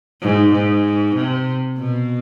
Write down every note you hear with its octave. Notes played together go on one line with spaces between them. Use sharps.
G#2
G#2
C3
B2